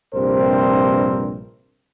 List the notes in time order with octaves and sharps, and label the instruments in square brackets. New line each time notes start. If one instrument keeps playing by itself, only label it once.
[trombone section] A#1 G2 C3 C4 A#4 C5